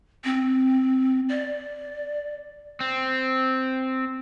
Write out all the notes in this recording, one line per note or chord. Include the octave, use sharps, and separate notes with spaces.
C4
D5
C4